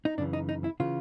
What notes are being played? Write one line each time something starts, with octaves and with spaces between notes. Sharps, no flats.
D#4
F#2 C#3 E3 D4
D#4
D#4
E4
C#3 E3 F4